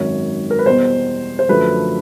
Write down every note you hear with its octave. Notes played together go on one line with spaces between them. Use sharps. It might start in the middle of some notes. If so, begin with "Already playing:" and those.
Already playing: G#1 F#2 D#3 C#5
A#4
B4
E2 B2 G3 C5
C5
F#2 D3 F3 A3 B4